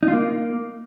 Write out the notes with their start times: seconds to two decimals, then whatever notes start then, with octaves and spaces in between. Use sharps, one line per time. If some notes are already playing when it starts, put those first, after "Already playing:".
0.03 D#4
0.08 F4
0.13 A#3